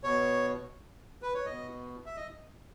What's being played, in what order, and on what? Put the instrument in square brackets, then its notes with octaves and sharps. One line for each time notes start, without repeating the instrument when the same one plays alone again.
[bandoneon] B2 C#5
B4
C#5
B2 D#5
E5
D#5